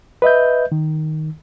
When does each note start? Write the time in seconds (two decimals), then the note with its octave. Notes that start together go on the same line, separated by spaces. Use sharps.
0.22 B4 D#5 E5 G6
0.72 D#3